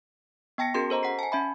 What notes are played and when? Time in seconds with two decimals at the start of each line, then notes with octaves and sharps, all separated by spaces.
0.58 B3 G5 A5 A#6 C#7
0.74 C#4 F#4 G#4 A#4 C6
0.90 A4 C5 D#5 A#5
1.03 F#5 B6 C7
1.19 G#5 A5
1.32 C#4 E5 B5